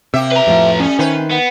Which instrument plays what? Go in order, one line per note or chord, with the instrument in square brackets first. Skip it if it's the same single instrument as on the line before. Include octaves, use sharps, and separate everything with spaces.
[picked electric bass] C3 [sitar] A#3 G4 E5
[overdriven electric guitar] B4 A#5
[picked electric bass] F2 A2 F3
[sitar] G3 A3 [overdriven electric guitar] C#4
[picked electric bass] D#3 [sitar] B4 C5
[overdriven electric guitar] B3